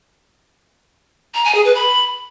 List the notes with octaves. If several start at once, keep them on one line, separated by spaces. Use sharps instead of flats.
A#5
G#5
G#4
B4
B5